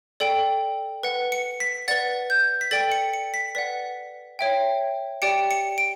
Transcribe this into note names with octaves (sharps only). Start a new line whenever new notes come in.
A4 D5 G5
B4 F#5
C#7
B6
B4 D5 F#5 A6
G6
B6
A4 D5 G5 A6
C#7
C#7
B6
B4 D5 F#5 B6
C#5 E5 G5
G4 D5 G5 C#7
C#7
D7